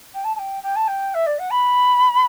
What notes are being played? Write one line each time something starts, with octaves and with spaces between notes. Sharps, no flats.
G5
A5
A5
G5
G5
A5
G5
E5
D5
F#5
B5